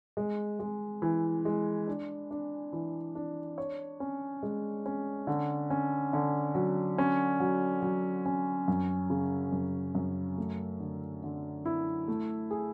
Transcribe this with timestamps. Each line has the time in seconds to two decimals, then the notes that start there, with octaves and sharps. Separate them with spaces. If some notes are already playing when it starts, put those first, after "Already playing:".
0.17 G#3
0.60 G#3
1.02 E3
1.45 G#3
1.87 D4
2.31 D4
2.73 E3
3.15 D4
3.58 C#5
4.00 C#4
4.43 G#3
4.86 C#4
5.27 D3
5.70 C#4
6.13 D3
6.55 F#3
6.98 C#4
7.40 F#3
7.82 F#3
8.26 C#4
8.68 F#2
9.10 C#3
9.52 F#2
9.95 F#2
10.38 A3
10.80 D3
11.23 D3
11.65 E4
12.08 A3
12.51 G#4